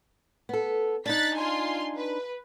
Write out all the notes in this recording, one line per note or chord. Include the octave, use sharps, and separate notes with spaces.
B3 A4
D4 D#4 F#6 A6 B6
F4 G#5 C6
B4